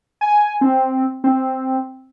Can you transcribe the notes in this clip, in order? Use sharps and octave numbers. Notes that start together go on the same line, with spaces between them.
G#5
C4
C4